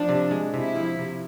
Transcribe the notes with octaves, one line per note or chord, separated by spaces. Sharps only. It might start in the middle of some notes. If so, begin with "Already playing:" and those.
Already playing: F3 D4
C3
G#3
C3 E4
F3
C3